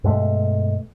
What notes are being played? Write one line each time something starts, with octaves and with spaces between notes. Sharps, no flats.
G2 B2 G#3 A3